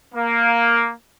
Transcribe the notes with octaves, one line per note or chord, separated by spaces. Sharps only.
A#3